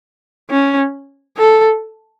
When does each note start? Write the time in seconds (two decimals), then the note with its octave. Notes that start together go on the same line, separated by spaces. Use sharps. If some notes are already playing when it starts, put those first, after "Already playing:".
0.50 C#4
1.38 A4